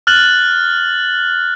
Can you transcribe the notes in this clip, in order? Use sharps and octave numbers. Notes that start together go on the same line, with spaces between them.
F6 F#6 A6 F#7